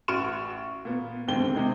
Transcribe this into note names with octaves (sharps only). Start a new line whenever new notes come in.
A1 F#4 C#6 F6 D7 E7
A#2 B3
F#1 D#2 G#2 D3 C4 G7
C3 D#3 G#3